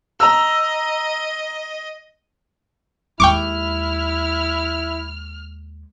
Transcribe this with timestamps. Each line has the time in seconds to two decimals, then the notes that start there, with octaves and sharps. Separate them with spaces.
0.20 D#5 A#5 E6
3.20 D#2 G#3 E4 G5 C#6 D6 F6